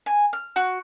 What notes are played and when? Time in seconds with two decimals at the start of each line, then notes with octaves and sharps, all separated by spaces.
0.06 G#5
0.33 F6
0.56 F#4